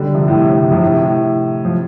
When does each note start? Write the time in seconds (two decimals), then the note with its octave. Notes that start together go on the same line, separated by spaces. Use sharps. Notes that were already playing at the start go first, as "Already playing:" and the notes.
Already playing: D3 G3
0.14 C3 F3
0.28 A2
0.37 C3
0.48 A2
0.60 C3
0.71 C3 F3
0.82 A2
0.94 C3
1.05 A2
1.65 F3